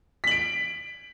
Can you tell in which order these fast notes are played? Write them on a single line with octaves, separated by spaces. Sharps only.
B6 F#7 D7